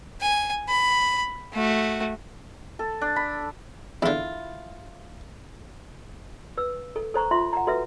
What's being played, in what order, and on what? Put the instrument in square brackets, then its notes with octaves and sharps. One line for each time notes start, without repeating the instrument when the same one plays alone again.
[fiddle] G#5
B5
A3 F#4
[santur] A4
D4
B5
[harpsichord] E2 D3 [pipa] E4 F4
[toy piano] B4 E6
A4
A4 C5 A#5 C#6
F4 E5 C6
F#5 A#5
F#4 A4 B4 E5